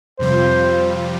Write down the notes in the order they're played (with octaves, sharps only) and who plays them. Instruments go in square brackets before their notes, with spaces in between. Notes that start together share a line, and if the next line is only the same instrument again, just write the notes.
[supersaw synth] F2 C3 G3 F4 [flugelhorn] C5